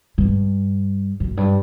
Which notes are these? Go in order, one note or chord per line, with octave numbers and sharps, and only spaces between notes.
G2
F#2
G2